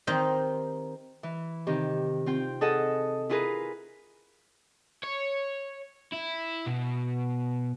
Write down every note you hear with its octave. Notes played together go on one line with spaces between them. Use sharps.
D#3 C4 D#4 G4 C5 D#5
E3
C3 D#3 G4
C4 F4 G5
G#4 A4 D#5 F#5 A5
E4 F4 G#4 A#4 B4
C#5
E4
B2